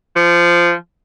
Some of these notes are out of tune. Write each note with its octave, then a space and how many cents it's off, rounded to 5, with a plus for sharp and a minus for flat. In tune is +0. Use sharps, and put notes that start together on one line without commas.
F3 -15